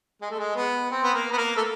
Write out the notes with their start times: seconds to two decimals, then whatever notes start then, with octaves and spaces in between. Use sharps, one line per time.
0.22 G#3
0.30 A3
0.39 G#3
0.56 B3
0.91 C4
1.04 B3
1.14 A#3
1.32 B3
1.37 A#3
1.56 A3